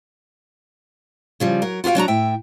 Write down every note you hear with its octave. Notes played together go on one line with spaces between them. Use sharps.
C#3 F3 G3
F#3 A#4
F4 F#4 G#4 F5 G5
F#3 D4 F#4 A#5
A2 E5 G5